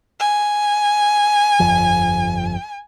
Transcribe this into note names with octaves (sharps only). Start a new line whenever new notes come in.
G#5
G1 F2 F3